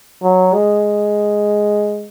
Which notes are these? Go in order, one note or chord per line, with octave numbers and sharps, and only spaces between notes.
F#3
G#3